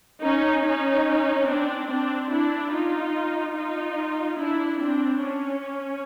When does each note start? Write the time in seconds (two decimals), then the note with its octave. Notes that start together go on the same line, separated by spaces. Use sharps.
0.22 C#4 D#4
0.64 C#4 D#4
1.48 C4 D4
1.89 C4 D4
2.31 D4 E4
2.72 D#4 F4
3.55 D#4 F4
4.39 D4 E4
4.81 C4 D4
5.22 C#4